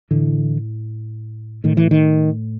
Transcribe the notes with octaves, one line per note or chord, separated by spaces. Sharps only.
A2 D3 E3
A2 D#3
E3
D#3